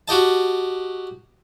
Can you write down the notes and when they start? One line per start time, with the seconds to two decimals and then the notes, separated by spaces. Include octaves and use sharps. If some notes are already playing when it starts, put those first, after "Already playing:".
0.08 F#4 G4 D#5 A5